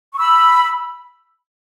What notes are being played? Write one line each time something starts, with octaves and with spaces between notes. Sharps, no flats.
C#6
B5 E6